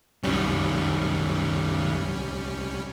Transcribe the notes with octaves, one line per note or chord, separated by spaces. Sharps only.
C2 F#2 D#3 G3 C#4